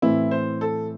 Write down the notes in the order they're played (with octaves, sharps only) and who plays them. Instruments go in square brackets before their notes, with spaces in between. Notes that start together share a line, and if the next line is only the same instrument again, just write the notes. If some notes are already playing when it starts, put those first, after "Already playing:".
[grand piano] A2 E3 C4 [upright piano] E4
[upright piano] C5
A4